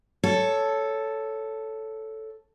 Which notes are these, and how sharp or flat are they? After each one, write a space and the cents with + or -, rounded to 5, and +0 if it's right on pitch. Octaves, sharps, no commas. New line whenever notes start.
A4 +0 C#5 +10